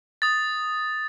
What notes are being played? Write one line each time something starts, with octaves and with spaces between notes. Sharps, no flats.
D#6 A6